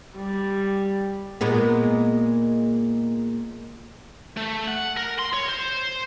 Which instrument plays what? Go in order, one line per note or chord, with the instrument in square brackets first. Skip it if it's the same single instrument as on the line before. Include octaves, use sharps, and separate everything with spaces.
[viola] G3
[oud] A#2 G#3 B3
[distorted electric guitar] A3
F#5
A#4
C6
C#5
C5